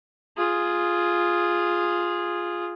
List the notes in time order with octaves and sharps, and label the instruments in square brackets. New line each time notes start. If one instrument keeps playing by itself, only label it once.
[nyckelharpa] F4 G#4